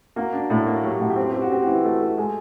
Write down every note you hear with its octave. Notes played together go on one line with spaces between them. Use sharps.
A#3 F#4
D4
A2
A#3 F#4
F#3 G4
A2 F#4
G4
C4 F#4
C4 G4
F#4
C4 G4
E3 F#4
A3
A3
G#3 G#4